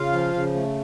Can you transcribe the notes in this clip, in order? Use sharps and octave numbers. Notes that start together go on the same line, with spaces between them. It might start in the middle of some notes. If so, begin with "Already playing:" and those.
Already playing: C#3 F4 F5
F3
C#3
A3